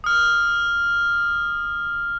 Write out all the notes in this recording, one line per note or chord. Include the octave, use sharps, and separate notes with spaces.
D#6 F6